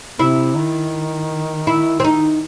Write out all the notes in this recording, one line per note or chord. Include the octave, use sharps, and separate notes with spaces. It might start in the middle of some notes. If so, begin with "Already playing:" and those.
C3 E4
D#3
E4
C4
D#4